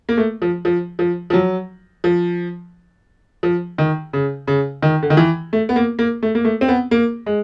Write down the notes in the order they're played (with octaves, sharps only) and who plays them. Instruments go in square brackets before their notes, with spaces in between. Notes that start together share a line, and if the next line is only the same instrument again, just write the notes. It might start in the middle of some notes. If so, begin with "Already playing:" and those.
[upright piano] A#3
A3
F3
F3
F3
F3
F#3
F3
F3
D#3
C#3
C#3
D#3
D3
D#3
E3
A3
B3
A#3
A#3
A3
A#3
A3
C4
B3
A#3
G#3